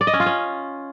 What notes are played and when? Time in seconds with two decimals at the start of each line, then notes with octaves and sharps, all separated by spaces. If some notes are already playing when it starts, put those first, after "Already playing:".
0.01 D5
0.07 D#5
0.13 C#4
0.20 F4
0.26 C#4